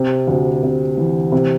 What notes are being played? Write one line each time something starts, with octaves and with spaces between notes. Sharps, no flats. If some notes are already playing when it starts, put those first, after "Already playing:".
Already playing: C3
D2
C3
E3
C3